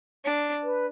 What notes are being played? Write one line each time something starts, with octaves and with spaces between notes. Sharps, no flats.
D4
B4